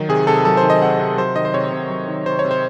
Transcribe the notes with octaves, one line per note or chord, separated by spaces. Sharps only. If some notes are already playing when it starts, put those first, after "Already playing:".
Already playing: D#3 F#3 D#4
C3 G#4
C3 A4
F#3 A4
C5
D#3
D#5
C3 F#5
C3
F#3 C5
D#3 D#5
C5
C3 C#5
C3
F#3
D#3
C3 C5
C#5
C3
C5